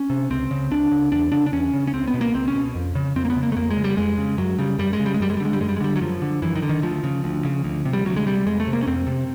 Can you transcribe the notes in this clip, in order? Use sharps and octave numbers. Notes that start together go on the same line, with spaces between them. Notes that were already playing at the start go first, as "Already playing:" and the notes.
Already playing: C#4
C3
C#2 C4
C#3
C#2 D4
C#3
E2 D4
C#3 D4
D4
E2 C#4
C#3
C#4
C#2 C4
B3
B2
A#3
C#2 C4
C#4
B2
F2
C#3
F2 C4
A#3
B3
C#3
A#3
A3
F2 A#3
G#3
C#3
G3
F2 G#3
C#3
F#2 F#3
C#3 G3
F#2 G3
G#3
C#3
G3
G#3
F#2 G3
G#3
G3
D3 G#3
G3
F#2 G#3
G3
G#3
D3 G3
F#3
F#2 F3
D3
F#2 E3
D#3
D3
D#3
D2 F3
C#3
D2
C#3
D2
C3
G3
D2 F#3
G#3
C3 G3
F2 G#3
A3
C3
A#3
C#4
F2 C4
C3